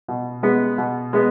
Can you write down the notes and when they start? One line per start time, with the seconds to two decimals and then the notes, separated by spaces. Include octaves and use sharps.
0.08 B2
0.43 G#3 B3
0.78 B2
1.13 G#3 B3